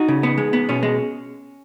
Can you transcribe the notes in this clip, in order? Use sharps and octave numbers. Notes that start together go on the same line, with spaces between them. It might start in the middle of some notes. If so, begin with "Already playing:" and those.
Already playing: D#4 F#4
C#3
B3
G#3
B3
B2 C#4
G#3